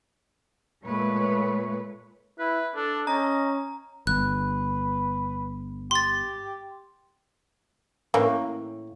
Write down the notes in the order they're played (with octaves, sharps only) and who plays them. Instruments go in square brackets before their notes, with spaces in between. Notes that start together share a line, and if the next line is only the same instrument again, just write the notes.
[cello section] A#2 G#3 A3 B4 C#5
[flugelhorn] E4 [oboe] B4
[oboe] D4 [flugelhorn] A4
[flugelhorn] C#4 [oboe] D#5 [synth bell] A#5
[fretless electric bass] G1 [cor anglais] B4 [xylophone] F#6
[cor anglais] G4 [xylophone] C6 A6
[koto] A2 [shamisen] E3 A#3 C#4